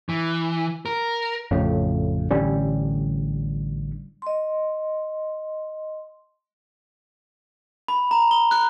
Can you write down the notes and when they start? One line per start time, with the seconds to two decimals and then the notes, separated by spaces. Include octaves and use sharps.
0.09 E3
0.86 A#4
1.51 A1 F2 A2 C#3
2.31 A1 D3 G3 C#4
4.22 D#5 C6
7.88 B5
8.11 A#5
8.31 G7
8.51 F#6